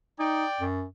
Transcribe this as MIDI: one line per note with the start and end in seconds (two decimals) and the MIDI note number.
0.20 0.45 63
0.20 0.65 74
0.20 0.65 79
0.60 0.84 42